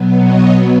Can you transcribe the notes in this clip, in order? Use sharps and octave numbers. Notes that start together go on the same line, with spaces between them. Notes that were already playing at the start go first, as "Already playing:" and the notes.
Already playing: B2 F#3 B3
C#5 D#5